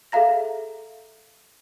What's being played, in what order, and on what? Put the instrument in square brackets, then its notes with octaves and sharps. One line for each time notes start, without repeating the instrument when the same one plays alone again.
[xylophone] G#4 A4 E5 F5 A#5 A#6